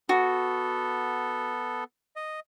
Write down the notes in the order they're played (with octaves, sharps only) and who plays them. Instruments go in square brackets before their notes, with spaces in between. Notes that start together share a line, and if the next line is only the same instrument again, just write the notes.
[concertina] B3 A4 [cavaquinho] F#4
[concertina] D#5